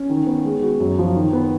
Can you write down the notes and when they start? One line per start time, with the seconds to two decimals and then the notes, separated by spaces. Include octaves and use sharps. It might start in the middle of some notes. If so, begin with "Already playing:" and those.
Already playing: C#4
0.09 D#3
0.27 B3
0.45 G#3
0.62 F#4
0.80 F#2
0.99 F3
1.16 D#3
1.33 B3